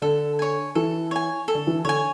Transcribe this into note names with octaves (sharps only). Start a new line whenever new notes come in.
D3 A4
C#5 G#5
E3 A4
C#5 G#5
A4
D3
E3
D3 C#5 G#5